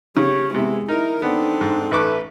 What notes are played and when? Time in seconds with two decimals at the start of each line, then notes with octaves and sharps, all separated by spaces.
0.17 C#3 G4 C#5
0.55 C3 G#3 B3 E4
0.88 D#4 E4 A#4
1.22 E2 B3 C4 D4 D#4 A4
1.61 G#2
1.91 A1 A3 B4 C#6 D6